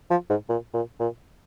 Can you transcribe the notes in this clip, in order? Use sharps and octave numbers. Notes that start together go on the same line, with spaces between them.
F3
G#2
A#2
A#2
A#2